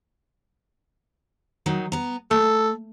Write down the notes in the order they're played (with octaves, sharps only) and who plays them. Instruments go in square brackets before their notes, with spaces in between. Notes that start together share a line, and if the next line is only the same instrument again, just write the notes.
[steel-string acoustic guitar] D#3 F#3 D#4
B3 A#5
[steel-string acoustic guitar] A3 [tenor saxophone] A4